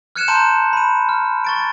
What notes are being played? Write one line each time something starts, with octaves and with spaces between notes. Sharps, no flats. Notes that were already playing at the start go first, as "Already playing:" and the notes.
F6 F#6 G#6 C#7 D#7 E7
A5 A#5 C6 G6 D#7
B5 D#7
F6
C#6 A6 D7